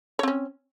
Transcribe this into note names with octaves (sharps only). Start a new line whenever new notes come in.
C4 C#4 C#5